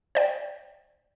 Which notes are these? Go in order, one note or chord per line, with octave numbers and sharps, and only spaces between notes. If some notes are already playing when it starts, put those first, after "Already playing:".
C5 D5 G5